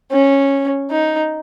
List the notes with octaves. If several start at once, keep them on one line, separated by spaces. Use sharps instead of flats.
C#4
D#4